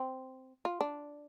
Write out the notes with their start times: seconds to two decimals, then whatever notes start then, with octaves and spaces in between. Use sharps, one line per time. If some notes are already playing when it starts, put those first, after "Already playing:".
Already playing: C4
0.65 F4
0.81 D4